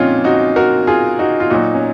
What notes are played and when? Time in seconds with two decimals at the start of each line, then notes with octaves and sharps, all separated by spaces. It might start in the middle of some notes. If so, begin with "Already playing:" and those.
Already playing: A#2 F3 C4 C#4 D#4 F4
0.24 D#4 F#4
0.56 F#4 A#4
0.87 F4 G#4
1.19 D#4 F#4
1.40 F4
1.50 A#2 F#3 D#4 F#4
1.74 C#4